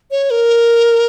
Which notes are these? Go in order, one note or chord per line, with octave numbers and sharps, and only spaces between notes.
C#5
A#4